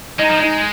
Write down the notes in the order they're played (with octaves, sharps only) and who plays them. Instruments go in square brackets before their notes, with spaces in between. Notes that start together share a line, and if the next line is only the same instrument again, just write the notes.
[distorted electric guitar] G#3 [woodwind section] D#4
[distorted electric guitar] F3
[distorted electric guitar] G#3 [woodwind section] D#4